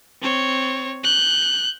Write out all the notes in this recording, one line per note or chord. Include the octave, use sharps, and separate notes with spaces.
C4 C#5
F#6 G6